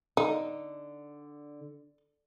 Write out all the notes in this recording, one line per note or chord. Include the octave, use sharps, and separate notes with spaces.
D3 D#4